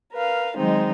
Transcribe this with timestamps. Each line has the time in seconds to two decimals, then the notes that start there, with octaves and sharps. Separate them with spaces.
0.12 A#4 B4 F5
0.56 D#3 F#3 G#3 C4 D#4